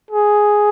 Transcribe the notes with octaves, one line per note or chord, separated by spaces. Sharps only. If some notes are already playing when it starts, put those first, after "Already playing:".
G#4